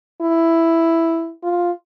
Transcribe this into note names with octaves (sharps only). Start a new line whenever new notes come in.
E4
F4